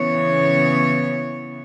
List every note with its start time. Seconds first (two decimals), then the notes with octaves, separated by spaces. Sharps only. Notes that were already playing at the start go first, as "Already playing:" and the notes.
Already playing: C#3 E3 B3 C#5